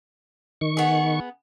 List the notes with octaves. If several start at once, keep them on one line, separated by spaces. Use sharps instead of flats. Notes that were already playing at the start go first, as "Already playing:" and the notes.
D#3 C#6
B3 G#4